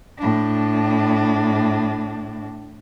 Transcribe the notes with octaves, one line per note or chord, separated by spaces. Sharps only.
A2 D4